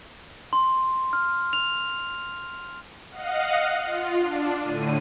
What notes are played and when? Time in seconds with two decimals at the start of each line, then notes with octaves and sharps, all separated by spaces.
0.53 C6
1.13 F6
1.53 F7
3.11 D#5 F5 F#5
3.85 F4
4.20 D4
4.60 A2 D3 D#7